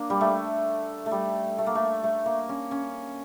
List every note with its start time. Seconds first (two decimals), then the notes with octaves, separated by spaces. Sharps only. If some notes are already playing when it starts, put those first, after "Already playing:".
Already playing: A#3 D4
0.10 G3
0.21 A3
1.06 A3
1.11 G3
1.58 A3
1.66 A#3
1.75 A3
2.04 A3
2.26 A#3
2.49 C#4
2.71 C#4